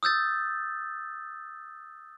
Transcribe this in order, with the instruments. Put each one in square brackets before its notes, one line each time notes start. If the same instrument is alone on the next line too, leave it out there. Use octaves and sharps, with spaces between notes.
[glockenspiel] D#6 E6 G6 A6